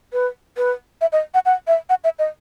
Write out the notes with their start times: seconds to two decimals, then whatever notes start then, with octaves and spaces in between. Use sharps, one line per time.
0.13 B4
0.57 B4
1.01 E5
1.12 D#5
1.34 F#5
1.46 F#5
1.67 E5
1.89 F#5
2.04 E5
2.19 D#5